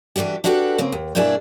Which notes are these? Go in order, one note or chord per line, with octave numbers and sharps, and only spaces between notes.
D3 E3 G3 F#4 G4
D4 E4 F#4 G4 A4 B4
C#3 A#3 C4
D#2
G2 B2 A#3 D4 E4 G#4